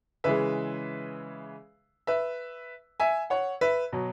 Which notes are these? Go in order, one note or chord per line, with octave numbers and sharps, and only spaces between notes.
C#3 E3 G#3 B4 E5
B4 E5
E5 G#5
C#5 F#5
B4 E5
B2 F#3